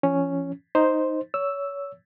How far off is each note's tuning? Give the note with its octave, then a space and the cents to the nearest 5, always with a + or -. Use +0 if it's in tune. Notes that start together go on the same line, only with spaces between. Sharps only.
F3 -40 C#4 +0
D#4 +0 C5 +0
C#5 +25 E6 +0